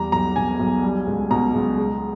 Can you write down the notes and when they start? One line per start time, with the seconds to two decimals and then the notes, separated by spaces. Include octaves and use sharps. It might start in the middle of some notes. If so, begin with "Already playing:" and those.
Already playing: E2 G3 A#5
0.12 B1 A#5
0.36 B2 G#5
0.60 B1
0.83 G3
1.07 C#2
1.30 B2 A#5
1.54 C#2
1.78 G#3